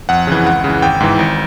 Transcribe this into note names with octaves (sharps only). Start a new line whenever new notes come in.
F2 F#5
C#3 E3
C#2 F#5
C#3 E3
G#1 G5
G#2 E3
G#1